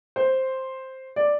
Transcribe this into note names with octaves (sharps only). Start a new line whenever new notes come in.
C5
D5